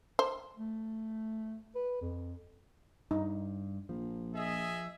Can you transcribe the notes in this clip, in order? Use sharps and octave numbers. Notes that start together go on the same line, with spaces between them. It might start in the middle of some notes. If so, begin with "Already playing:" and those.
C5
A3
B4
F2
G2 D#4
A#1 F3
G#4 D#5 E5